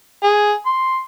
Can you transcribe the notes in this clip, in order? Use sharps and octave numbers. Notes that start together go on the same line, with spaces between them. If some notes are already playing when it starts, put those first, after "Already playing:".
G#4
C6